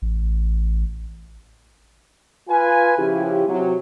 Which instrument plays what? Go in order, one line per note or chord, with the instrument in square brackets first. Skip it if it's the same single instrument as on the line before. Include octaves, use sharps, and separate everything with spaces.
[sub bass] A1
[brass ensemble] F4 B4 G#5
C#3 F3 C#4 E4 F4 G4
C3 F#3